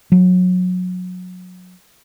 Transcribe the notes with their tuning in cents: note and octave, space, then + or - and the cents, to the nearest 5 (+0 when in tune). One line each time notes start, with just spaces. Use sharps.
F#3 -25